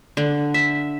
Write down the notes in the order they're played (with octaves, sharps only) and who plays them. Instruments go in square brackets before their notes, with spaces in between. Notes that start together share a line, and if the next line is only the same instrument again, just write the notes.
[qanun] D3
E5